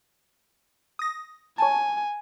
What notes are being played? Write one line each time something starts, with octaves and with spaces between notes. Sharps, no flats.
D#6 A#6
C#5 G#5 A5